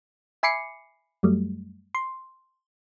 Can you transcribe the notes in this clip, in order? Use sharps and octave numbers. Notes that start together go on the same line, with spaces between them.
E5 G#5 B5 D6 C7 C#7
F#2 F#3 G3 A3
C6